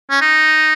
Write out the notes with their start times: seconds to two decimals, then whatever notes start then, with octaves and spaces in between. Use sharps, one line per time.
0.10 C#4
0.21 D#4